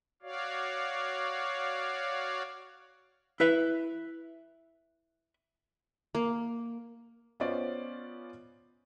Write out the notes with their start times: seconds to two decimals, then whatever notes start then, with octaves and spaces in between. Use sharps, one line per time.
0.22 F#4 C#5 D5 F5
3.40 E4 B4 E5
6.15 A#3
7.40 B3 C#4 F4 C5 D5 D#5